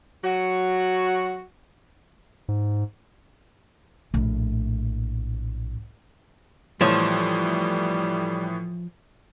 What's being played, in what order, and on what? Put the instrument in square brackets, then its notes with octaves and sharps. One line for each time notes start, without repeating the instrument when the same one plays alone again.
[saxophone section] F#3 F#4
[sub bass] G#2
[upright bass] A#1 A2
[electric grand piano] A2 E3 E7 [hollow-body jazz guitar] F3 C#5 [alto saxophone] G3